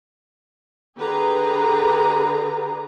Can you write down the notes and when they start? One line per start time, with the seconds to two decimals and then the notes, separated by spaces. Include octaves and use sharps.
0.97 D3 G4 G#4 B4 A#5